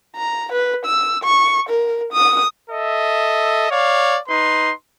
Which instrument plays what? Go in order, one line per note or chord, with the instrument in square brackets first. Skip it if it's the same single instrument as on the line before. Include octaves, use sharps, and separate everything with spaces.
[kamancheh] A#5
B4
E6
C#6
A#4
D#6
[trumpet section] A4 D#5 E5
C#5 D5 F5
D#4 B4 C6